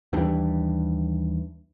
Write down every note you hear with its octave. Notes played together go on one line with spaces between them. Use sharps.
D#2 E3 G3 D4